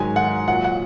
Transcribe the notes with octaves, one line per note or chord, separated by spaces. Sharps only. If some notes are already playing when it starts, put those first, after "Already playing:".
Already playing: G#2 D#3 F#3 G#5
F#5
A#2 F#3 F#5
F#5